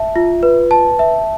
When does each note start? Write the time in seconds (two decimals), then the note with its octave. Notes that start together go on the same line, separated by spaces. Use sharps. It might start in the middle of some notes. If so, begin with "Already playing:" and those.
Already playing: E5 A5
0.16 F4
0.43 B4
0.71 A5
0.99 E5